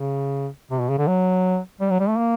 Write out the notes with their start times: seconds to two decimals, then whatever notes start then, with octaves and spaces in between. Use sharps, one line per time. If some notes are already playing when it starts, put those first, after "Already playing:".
Already playing: C#3
0.71 C3
0.80 B2
0.89 C#3
0.98 D3
1.07 F#3
1.81 G3
1.90 F#3
2.00 G3
2.08 A3
2.18 A#3